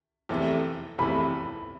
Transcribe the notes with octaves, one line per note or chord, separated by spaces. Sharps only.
F1 E2 C3 E3 A3
F1 E2 C3 E3 A3 B5